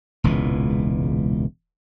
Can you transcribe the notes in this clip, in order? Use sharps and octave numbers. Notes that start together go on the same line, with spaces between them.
E1 C#2 A#2 E3